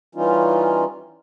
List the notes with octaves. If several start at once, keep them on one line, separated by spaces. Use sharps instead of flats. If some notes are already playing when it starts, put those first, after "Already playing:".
E3 G3 C#4 D#4 F4